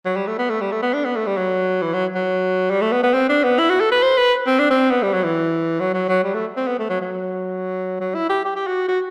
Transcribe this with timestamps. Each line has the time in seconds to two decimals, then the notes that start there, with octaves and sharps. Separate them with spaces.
0.05 F#3
0.16 G3
0.27 A3
0.39 B3
0.50 A3
0.61 G3
0.72 A3
0.82 B3
0.94 D4
1.05 B3
1.16 A3
1.27 G3
1.37 F#3
1.82 E3
1.93 F#3
2.15 F#3
2.70 G3
2.81 A3
2.92 B3
3.03 B3
3.14 C4
3.29 D4
3.44 B3
3.59 E4
3.70 F#4
3.81 A4
3.92 B4
4.02 C5
4.17 B4
4.47 C4
4.59 D4
4.70 C4
4.91 B3
5.03 G3
5.13 F#3
5.24 E3
5.80 F#3
5.94 F#3
6.09 F#3
6.24 G3
6.34 A3
6.57 C4
6.68 B3
6.79 A3
6.90 F#3
7.01 F#3
8.00 F#3
8.15 E4
8.30 G4
8.45 G4
8.56 G4
8.67 F#4
8.88 F#4